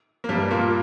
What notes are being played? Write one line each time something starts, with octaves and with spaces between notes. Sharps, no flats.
A#3
G2 G3
A#2 A#3